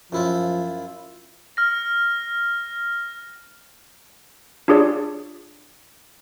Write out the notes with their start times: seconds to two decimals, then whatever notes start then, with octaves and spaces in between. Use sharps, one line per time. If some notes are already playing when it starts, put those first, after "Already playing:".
0.12 F#2 F3 E4 F4
1.57 F6 A#6
4.68 D4 F4 G4 G#4 C#5 D5